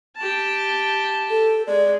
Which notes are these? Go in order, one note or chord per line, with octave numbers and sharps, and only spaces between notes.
G4 A5
A4
G#3 D5